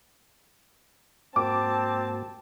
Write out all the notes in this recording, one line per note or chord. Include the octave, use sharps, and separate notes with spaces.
G#2 A#3 C4 F#4 A5 D6